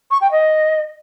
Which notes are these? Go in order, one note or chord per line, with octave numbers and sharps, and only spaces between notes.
C#6
G5
D#5